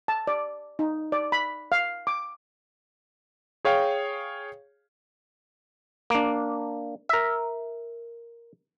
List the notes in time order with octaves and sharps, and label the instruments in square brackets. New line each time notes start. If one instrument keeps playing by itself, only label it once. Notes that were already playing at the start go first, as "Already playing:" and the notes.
[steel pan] A5
D5
D#4
D5
B5
F5
D6
[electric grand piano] G#4 C#5 F5 G5
[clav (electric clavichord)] A#3 D4
A#4 E5